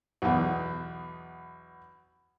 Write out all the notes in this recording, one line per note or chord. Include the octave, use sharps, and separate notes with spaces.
B1 E2